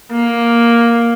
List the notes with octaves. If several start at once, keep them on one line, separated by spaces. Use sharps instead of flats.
A#3